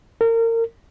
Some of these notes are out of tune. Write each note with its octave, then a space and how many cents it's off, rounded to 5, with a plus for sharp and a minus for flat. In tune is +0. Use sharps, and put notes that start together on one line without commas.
A#4 -30